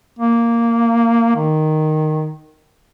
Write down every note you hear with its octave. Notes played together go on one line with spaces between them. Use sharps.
A#3
D#3